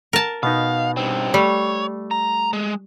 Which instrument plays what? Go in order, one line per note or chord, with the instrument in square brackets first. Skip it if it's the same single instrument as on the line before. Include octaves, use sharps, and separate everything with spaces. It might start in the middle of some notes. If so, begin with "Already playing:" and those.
[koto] A#4 A5
[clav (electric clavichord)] B2 B3 D#4 [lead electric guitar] F5
[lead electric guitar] G2 C4
[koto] G3 [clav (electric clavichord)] A3 [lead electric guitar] C#5
[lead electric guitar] A#5
G#3